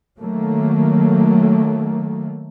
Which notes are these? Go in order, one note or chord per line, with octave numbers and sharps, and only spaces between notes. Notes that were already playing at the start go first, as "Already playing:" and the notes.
D#3 F#3 A3 A#3